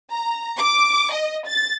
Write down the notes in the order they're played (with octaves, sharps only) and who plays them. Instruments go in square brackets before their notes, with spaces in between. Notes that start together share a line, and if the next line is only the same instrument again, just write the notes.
[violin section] A#5
D6
D#5
A6